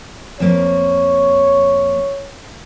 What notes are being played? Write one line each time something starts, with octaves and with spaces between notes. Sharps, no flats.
F2 A#3 C#5